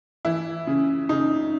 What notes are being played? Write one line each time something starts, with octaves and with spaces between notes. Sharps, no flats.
E3 E4
C#3
C#3 D#4